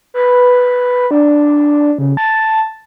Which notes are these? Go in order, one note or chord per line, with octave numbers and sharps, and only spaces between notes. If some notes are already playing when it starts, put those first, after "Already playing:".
B4
D4
C#3
A5